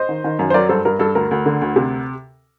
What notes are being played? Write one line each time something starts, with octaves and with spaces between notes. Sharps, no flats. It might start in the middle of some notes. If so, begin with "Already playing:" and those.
Already playing: C5 D#5
D#3
D#3
F#2
C5
F#3 A#4 D5
G2 A4 C5
G2 A#4
G2 A4
D2 A#4
D2
D3
D2
C3